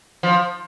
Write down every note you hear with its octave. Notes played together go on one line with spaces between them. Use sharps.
F3